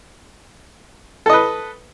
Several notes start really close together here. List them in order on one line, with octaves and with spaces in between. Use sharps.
A4 D#5 B4